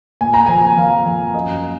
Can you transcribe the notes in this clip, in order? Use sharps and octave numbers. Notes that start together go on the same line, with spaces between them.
A#2 G#5
A#5
F3 G#5
F3 F5
F3
F#2 D#5